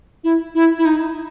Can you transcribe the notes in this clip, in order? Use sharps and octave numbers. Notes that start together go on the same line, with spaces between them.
E4
E4
E4
D#4